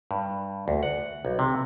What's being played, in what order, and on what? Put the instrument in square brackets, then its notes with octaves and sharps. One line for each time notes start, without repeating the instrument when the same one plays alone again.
[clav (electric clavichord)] G2
D2
F#5
B1
C3